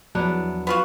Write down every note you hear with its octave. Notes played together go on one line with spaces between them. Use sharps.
E2 F3 F#3 B3 D4
B3 F4 F#4